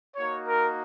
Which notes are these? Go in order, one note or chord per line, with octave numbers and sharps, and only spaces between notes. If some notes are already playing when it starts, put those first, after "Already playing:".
A#3 D#4 F#4 C#5
A#4